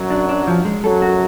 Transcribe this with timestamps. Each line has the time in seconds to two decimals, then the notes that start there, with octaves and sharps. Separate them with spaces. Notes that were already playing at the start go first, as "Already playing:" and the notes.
Already playing: F#2 F#3
0.11 D4
0.29 D4
0.47 F3
0.65 G#3
0.84 F#2 F#3 A4
1.02 F#4